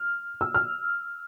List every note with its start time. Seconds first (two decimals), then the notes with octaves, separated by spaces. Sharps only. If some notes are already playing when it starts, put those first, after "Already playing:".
Already playing: F6
0.41 E6
0.54 F6